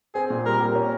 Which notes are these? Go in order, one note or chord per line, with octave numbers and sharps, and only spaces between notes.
C4 G#4
A#2
G3 A#4
G4
C#4